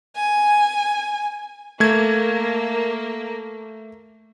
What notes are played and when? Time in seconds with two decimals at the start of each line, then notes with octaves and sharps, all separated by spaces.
0.16 G#5
1.80 A3 A#3 G#6